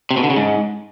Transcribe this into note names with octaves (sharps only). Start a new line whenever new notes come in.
C3
B2
D3
C#3
G#2